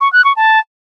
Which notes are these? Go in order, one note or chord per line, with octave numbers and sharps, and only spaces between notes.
C#6
F#6
C#6
A5